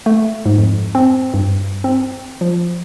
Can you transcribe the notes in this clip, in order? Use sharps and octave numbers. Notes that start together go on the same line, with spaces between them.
A3
G#2
F2
C4
G2
C4
F3